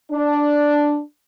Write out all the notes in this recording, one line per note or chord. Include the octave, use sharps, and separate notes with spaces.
D4